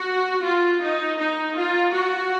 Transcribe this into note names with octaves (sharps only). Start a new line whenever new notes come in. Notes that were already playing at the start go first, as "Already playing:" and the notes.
Already playing: F#4
F4
D#4
D#4
F4
F#4